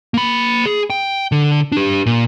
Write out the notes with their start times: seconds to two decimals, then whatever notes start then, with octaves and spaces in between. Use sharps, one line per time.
0.14 A#3 B5
0.66 G#4
0.90 G5
1.32 D3
1.72 D4 G4
2.06 A#2